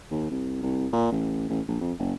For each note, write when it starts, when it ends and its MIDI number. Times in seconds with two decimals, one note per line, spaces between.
0.11 0.27 39
0.31 0.61 36
0.62 0.87 36
0.93 1.07 46
1.12 1.48 33
1.50 1.61 33
1.68 1.76 34
1.81 1.93 41
1.99 2.13 30